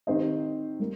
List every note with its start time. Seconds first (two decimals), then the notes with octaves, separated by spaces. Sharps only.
0.07 D#3 C4 G4 C5 D#5
0.79 G3 A#3